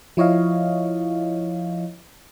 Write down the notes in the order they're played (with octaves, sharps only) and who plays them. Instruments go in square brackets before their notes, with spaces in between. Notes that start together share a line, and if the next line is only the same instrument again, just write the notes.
[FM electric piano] F3 E4 C#5 D#5 F5